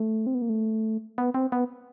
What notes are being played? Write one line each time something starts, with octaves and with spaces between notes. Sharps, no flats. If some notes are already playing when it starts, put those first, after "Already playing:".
Already playing: A3
C4
B3
A#3
A3
B3
C4
B3